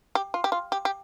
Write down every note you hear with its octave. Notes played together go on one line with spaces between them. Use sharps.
G4
F4
G4
F4
G4
G4